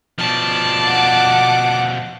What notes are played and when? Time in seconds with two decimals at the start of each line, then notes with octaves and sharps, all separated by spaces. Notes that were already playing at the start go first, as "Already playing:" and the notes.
0.18 B2 F3 D5 A5
0.85 F#5 D6